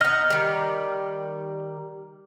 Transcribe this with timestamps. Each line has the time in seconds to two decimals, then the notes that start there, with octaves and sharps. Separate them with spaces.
0.01 B3 D#4 D#5 F6
0.30 D#3 G3